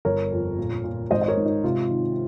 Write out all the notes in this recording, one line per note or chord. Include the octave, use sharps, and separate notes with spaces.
G1 A#4 C#5
F2
A#2
A#2
G#1 C5 D#5
D#5
A#4 C#5
G#2
D#4
C3 F4
D#3